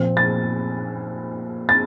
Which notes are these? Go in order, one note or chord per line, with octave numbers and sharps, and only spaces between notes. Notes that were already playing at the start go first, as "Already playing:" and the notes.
Already playing: A#2 F3 C4
A6
A6